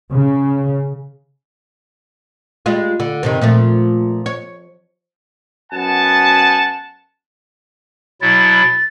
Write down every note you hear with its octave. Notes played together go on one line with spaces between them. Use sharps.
C#3
G3 G#3 F4
D3
G2 C3 D#3
A#2 F3 A3
C#5
F#2 B3 F#5 G#5 A5
B2 F#3 E4 A6